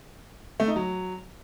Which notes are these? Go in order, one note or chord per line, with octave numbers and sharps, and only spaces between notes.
A3
D#4
F#3